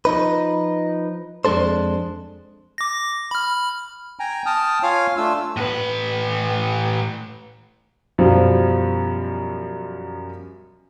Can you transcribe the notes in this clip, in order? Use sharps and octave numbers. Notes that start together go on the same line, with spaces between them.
F3 D#4 B4
F2 G#3 D4 A4 C5
D6 A#6
B5 F6
G5 G#5 A#5
G5 A5 D#6 F6
F4 C#5 F5 G#5 F6
A3 D4 F4 E6
A2 B4
F#2 B2 F3 G3